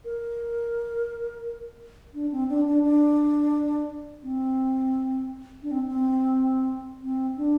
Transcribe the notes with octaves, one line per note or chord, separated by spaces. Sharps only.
A#4
D4
C4
D4
D4
D4
C4
D4
C4
C4
C4
D4